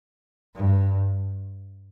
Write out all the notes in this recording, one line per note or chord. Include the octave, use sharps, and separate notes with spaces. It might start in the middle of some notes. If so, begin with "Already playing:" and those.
G2